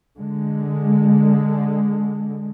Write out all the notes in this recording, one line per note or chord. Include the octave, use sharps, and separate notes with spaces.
D3 G#3